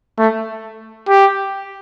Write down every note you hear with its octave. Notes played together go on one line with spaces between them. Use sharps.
A3
G4